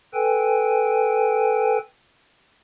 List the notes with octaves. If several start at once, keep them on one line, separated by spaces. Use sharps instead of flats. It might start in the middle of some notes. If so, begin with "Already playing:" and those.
A4 B4 G5 G#5